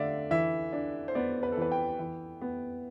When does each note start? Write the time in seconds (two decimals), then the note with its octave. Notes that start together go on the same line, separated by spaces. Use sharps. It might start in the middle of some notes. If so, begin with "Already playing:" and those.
Already playing: D3 A3 D5 E5 F5
0.31 E3 E5
0.73 D4
1.08 C5
1.15 B3 D5
1.43 B4
1.52 A4
1.57 E3 B4
1.72 G5
1.99 E3
2.41 B3